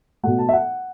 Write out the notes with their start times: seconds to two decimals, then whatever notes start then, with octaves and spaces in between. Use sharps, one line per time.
0.23 B2 A3 F#5
0.38 A5
0.49 E5
0.53 F#5